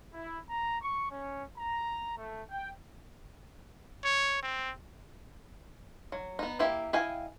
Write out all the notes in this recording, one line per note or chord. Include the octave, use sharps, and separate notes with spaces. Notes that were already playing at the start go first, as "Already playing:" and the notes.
E4
A#5
C#6
C#4
A#5
A3
G5
C#5
C4
F#3
B3 D#4
A#3 E4 G4 E5
E4 D#5 F5 G5 G#5